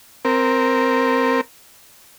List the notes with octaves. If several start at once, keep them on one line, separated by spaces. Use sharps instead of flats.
C4 A#4